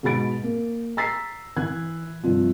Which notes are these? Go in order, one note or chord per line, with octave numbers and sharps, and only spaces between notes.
G#2 B2 F#4 B5 A6 D7
A#3
A#5 E6 A6 B6 C7
E3 F#6 G#6
G2 C3 F3